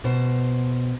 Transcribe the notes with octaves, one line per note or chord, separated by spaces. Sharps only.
B2 C5